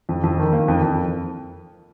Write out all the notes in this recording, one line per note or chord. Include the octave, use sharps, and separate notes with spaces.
F2
F2
D#3
A#3
F2
F2